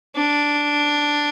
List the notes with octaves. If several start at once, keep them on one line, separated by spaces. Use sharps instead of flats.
D4